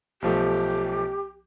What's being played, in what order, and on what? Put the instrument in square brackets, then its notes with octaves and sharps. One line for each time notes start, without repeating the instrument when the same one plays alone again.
[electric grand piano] B1 F3 A3 [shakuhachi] G4